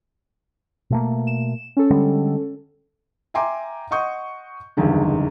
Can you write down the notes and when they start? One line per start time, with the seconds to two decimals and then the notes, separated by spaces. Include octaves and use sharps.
0.90 B2 A3 A#3
1.27 E7
1.77 C#4 A4
1.91 D3 G3 G#3
3.34 E5 G5 G#5 A#5 C6 D6
3.91 D#5 F#5 C6 C#6 D#6 G6
4.77 F#1 E2 G2 D3 D#3 D#4